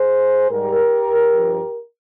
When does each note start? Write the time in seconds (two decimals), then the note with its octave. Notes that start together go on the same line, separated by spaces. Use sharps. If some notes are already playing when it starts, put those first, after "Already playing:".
Already playing: G#4 C5
0.51 G#2 G3 G4 A#4
1.32 G2 F3